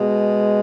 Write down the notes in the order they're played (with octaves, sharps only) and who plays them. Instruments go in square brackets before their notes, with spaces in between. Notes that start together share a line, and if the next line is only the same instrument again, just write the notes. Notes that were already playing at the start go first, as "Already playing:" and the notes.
Already playing: [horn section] B2 G#3